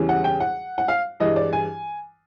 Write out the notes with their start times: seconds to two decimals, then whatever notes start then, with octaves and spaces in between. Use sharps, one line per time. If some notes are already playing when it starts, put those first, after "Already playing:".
Already playing: E2 C#3 E3 G3
0.09 F#5
0.24 G5
0.40 F#5
0.78 F#5
0.88 F5
1.20 G2 E3 G#3 D#5
1.36 D5
1.53 G#5